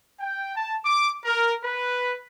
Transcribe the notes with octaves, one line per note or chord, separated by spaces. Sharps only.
G5
A5
D6
A#4
B4